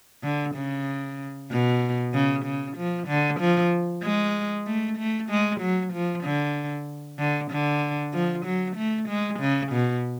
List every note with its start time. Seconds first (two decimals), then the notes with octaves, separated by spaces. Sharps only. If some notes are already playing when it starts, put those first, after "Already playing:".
0.23 D3
0.55 C#3
1.50 B2
2.13 C#3
2.45 C#3
2.77 F3
3.08 D3
3.40 F3
4.03 G#3
4.67 A3
4.98 A3
5.30 G#3
5.60 F#3
5.93 F3
6.24 D3
7.19 D3
7.51 D3
8.13 F3
8.45 F#3
8.76 A3
9.08 G#3
9.40 C#3
9.72 B2